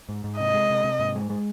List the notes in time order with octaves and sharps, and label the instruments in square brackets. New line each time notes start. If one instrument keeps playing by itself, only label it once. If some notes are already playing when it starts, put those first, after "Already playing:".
[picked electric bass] G#2
G#2
[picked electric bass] C3 [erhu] D#5
[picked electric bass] G#3
C3
C3
G#2
G#3
G#3